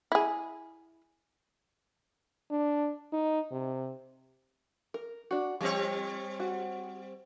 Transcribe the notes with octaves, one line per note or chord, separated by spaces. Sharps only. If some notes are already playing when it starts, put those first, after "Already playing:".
E4 G#4
D4
D#4
C3
A#4
D4 F#4
F3 G3 C4 C#5
F#4